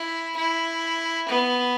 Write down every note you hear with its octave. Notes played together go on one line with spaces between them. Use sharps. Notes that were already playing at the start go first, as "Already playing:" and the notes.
Already playing: E4
E4
B3